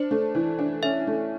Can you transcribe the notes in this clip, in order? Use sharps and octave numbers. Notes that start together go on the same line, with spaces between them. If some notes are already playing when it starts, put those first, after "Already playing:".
Already playing: D4 C5
A3
E3
D4
C#4 E5
A3